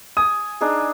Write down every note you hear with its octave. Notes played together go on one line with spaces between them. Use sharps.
G#5 D#6
D4 D#4 G#4